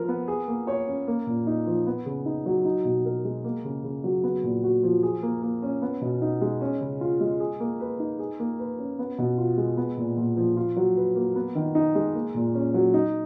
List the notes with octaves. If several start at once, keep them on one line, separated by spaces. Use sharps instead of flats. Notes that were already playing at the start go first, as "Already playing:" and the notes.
Already playing: F3 A#4
B3
G#4
A#3
C#5
C#4
A#3
A#2
D#4
F3
B3
C#3
D#4
F#3
D#4
B2
A#4
G#3
A#3
C#3
C#3
F#3
B3
A#2
F#4
F3
G#4
A#3
A#3
C#4
B3
B2
D#4
G#3
C#4
C#3
F4
G#3
G#4
A#3
B4
D#4
G#4
A#3
B4
C#4
B3
B2
F4
G#3
B3
A#2
A#2
F3
F4
F#3
B4
A#3
B3
D#3
D#4
G#3
A#3
A#2
C#4
F#3
D#4